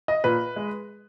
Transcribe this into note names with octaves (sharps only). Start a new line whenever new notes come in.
D#5
A#2 B4
G#3